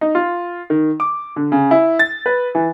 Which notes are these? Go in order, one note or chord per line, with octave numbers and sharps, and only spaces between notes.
D#4
F4
D#3
D6
D3
C#3
E4
A6
B4
E3